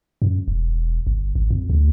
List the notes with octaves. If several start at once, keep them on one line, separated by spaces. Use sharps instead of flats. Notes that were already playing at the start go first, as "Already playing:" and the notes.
F#2
E1
G1
G#1
F2
D2